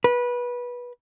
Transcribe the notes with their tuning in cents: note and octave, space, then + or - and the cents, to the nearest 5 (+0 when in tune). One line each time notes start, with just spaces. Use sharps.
B4 -20